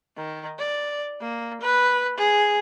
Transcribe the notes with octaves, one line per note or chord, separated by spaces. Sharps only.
D#3
D5
A#3
B4
G#4